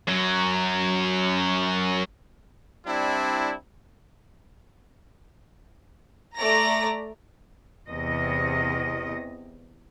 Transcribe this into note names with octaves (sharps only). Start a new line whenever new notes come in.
F#2 F#3
G3 C4 D4 E4
A3 D5 A#5 A#6
E2 C3 D#5